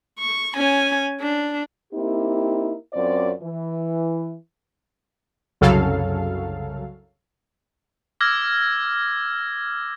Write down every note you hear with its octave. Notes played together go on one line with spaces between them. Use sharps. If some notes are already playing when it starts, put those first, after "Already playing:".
C#6
C#4 G#5
D4
A#3 C4 D#4 E4 G4
F#2 C4 F4 C5 D5
E3
C2 F#2 C#3 F#3 A4 F5
D6 E6 F6 G#6 A#6